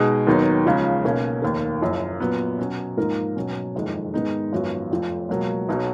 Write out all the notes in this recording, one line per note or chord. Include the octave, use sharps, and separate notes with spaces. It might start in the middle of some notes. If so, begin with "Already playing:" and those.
Already playing: B2 G#3 D#4 G#4
D#2 D#3 F#3 B3 D#4
C#2 C#3 F3
B1 B2 A#3 C#4
F1 D#2 D#3 A#3
F#1 F#2 F3
A#2 F#3 B3
B2 F#3 C#4
G#2 F3 A#3 D#4 A#4
B2 F#3 C#4
F#1 F2 D#3 G#3
G#2 D#3 G#3 B3 D#4
G#1 F#2 F3 B3 F#4
F1 F2 F3
C#2 B2 F#3 A#3
B1 B2 F#3